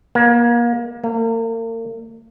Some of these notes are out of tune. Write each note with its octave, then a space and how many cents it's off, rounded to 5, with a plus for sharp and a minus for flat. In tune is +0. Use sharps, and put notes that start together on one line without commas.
A#3 +30
A#3 -40